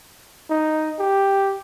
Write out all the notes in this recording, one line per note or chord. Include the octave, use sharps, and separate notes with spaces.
D#4
G4